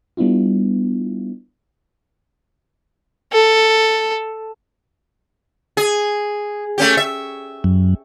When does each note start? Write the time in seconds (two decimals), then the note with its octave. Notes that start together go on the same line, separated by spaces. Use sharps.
0.17 G3 B3 D4 E4 F4
3.33 A4
5.77 G#4
6.78 A3 C#4 G4
6.97 E5
7.64 F#2